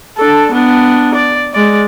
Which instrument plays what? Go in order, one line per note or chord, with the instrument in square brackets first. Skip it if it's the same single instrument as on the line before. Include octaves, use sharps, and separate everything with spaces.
[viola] D4 A4
B3 D4
D5
G#3 D5